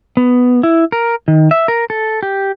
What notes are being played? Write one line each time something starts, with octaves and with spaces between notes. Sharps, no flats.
B3
E4
A#4
D#3
E5
A#4
A4
G4